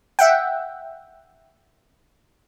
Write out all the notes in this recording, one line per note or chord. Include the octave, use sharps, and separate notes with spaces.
E5 F#5 G5